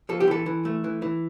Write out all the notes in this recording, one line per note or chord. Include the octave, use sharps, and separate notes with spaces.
F3 A4
G4
E3 A4
E3
A3
E3
E3